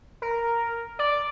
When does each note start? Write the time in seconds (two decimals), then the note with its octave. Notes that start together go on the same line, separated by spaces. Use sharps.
0.22 A#4
0.99 D5